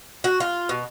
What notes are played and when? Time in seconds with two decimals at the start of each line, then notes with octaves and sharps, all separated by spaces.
0.24 F#4
0.40 F4
0.69 B2